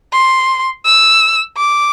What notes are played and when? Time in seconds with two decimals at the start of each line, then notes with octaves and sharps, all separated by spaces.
0.12 C6
0.85 E6
1.57 D6